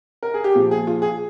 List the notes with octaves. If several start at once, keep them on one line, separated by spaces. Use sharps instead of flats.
A#4
G#4
G4
A#2 F3 F4
G#4
F4
G#4